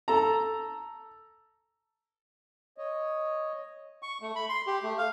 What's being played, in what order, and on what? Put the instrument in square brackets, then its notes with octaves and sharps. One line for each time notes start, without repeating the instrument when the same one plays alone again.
[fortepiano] A4 A#5
[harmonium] C#5 D#5
[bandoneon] C#6
A3
B5
C6
G4
A3
F5